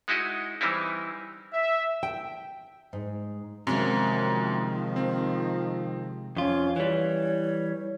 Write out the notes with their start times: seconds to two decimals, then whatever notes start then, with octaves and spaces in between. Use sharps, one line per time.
0.08 G#3 D#4 E4 F#4 D#5
0.61 E3 G3 C4 D#4 E4
1.53 E5
2.03 G5
2.93 G#2
3.67 F#2 C3 D#3 F3 G#3 A#3
4.96 C4
6.37 F2 C#4 F4
6.76 E3 G3 C#5